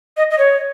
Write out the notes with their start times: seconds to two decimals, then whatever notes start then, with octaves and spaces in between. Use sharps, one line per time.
0.17 D#5
0.31 D#5
0.38 C#5